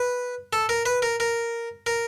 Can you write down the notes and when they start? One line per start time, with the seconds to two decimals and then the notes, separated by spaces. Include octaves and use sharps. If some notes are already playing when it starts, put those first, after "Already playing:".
Already playing: B4
0.53 A4
0.69 A#4
0.86 B4
1.02 A#4
1.20 A#4
1.86 A#4